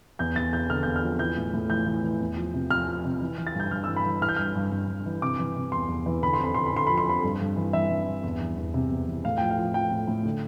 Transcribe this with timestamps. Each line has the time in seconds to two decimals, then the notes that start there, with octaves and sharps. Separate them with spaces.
0.19 E2 G6
0.36 E2 A6
0.53 E2 G6
0.70 D3 F6
0.83 E2 G6
0.96 F6
1.03 F3
1.19 E3 G6
1.37 A2
1.54 A2
1.70 E3 G6
1.86 E3
2.03 E3
2.21 E2
2.37 F3
2.54 C3
2.70 F3 F6
2.87 F3
3.05 C3
3.21 E3
3.38 E3
3.47 A6
3.55 G2 G6
3.71 G2 F6
3.84 E6
3.88 E3
3.97 B5
4.05 E3
4.21 E3 F6
4.29 G6
4.37 G2 F6
4.55 G2
4.71 G2
4.88 G2
5.06 E3
5.22 C3 D6
5.39 E3
5.56 C3
5.72 E2 C6
5.89 E2
6.06 E3
6.22 D3 B5
6.33 C6
6.39 F2 B5
6.54 D3 C6
6.66 B5
6.74 D3 C6
6.87 F3 B5
6.98 C6
7.07 F2 B5
7.23 G2
7.41 G2
7.56 E3
7.73 E3 E5
7.91 G2
8.08 G2
8.24 E2
8.41 E3
8.58 E2
8.74 C3
8.91 E2
9.07 E3
9.24 A2 F5
9.38 F3 G5
9.51 F5
9.58 F3
9.74 F3 G5
9.91 A2
10.08 A2
10.25 D3